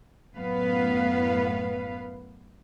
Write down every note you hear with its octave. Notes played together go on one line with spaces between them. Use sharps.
F#2 A2 B3 B4 F5